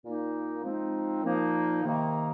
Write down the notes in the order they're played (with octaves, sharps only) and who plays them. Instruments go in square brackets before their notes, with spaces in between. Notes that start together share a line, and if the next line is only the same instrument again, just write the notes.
[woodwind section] A#2 A#3 D#4
F3 G#3 C4 D#4
A#2 F3 A#3 D#4
C3 D#3 A#3 D#4